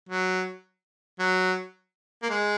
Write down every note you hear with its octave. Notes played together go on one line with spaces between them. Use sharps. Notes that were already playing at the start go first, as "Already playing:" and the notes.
F#3
F#3
A#3
G#3